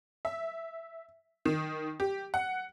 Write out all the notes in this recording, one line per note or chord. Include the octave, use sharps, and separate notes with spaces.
E5
D#3
G4
F#5